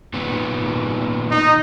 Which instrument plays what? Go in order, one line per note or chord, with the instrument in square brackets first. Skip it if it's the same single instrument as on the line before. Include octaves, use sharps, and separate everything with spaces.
[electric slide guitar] A#2 D#3 B3
[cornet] D#4